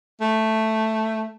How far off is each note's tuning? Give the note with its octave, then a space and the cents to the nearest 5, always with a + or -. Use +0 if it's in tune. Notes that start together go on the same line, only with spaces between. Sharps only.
A3 +0